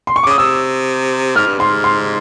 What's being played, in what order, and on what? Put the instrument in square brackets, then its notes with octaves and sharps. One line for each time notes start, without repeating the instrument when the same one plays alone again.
[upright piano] C6
C#6
D6
[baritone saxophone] C#3 [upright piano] D#6
[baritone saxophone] C3 [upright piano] E6
[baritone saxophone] G#2 [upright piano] F6
[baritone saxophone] G2
[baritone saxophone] G#2 [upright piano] C6
[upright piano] C6